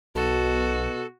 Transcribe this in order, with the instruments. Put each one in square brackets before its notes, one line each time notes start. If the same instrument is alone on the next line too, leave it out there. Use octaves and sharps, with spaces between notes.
[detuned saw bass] B1 [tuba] B2 [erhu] F#4 [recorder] A4